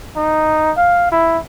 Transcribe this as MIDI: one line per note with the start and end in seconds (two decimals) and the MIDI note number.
0.16 0.72 63
0.77 1.11 77
1.11 1.38 64